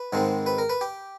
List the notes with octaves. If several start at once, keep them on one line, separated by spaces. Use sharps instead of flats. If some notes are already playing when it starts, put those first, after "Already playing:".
Already playing: B4
G#2 D#3 G#3 C4
B4
A#4
B4
G4